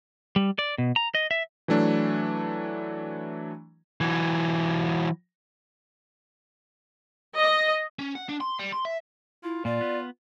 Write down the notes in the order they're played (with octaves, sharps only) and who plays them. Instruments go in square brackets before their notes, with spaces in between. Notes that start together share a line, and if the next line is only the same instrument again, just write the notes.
[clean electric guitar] G3
D5
B2
A#5
D#5
E5
[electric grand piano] E3 F#3 A3 D4
[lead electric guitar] E3 F#3
[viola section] D#5
[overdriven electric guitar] C#4
F#5
D4
C6
G3
C6
E5
[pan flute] E4 [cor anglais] F4
[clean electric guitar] A#2 [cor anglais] F4 [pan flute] D5
[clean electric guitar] B3